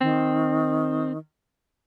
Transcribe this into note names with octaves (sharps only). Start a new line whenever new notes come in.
D#3 C4